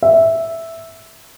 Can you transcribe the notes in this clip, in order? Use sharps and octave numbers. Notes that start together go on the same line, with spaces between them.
E5